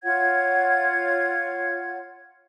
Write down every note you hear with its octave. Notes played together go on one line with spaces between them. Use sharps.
F4 C#5 F#5 G#6